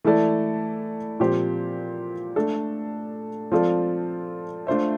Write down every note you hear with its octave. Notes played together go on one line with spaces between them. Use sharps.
E3 A3 E4 A4 D5
A#2 F3 C4 G4 C5
A3 D4 A4
F3 C4 F4 A4 D5
A3 D4 F4 C5 E5